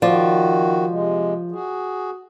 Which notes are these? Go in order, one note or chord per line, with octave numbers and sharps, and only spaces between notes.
D#3 F3 F#4 D5
C3 G#3
F#4 G#4